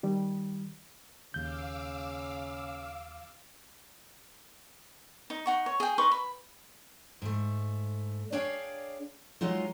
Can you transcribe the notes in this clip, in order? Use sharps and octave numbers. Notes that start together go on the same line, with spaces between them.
D#3 G3
D#2 C#3 F5 D6 E6 G6
D#4
D#4 F#5 C#6
C#5
G#4 G5
D#4 B4 C6 C#6
B5
G#2 A3
D4 G#4 C#5 D5 F5 G5
F#3 G#3 D#4 F4